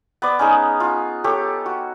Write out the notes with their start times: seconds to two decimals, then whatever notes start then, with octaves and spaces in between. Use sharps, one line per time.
0.22 B3 D5
0.39 C#4 D#4 G#4
0.80 F4
1.24 G4 A4 C#5
1.66 F#4